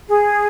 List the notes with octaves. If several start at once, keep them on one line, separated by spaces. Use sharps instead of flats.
G#4